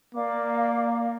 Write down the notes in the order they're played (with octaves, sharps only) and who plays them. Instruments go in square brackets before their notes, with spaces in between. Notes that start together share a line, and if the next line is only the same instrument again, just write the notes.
[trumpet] A#3 [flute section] D5 F5 D6